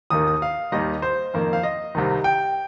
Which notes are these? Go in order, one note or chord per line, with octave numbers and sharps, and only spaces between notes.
D#2 D#3 A#3 D#6
D#6
F5
D#2 D#3 G3 A#3 D#5
C5
F2 D#3 A#3
F5
D#5
C2 C3 D#3
G5